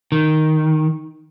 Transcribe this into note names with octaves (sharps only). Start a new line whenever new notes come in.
D#3